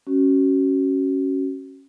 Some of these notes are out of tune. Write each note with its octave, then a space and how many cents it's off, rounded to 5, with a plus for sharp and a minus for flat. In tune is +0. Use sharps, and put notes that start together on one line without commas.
C#4 -10 F#4 +25